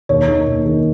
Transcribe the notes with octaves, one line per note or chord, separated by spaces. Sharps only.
D#2 C#5
D#3 A#3
D#2
D#3 A#3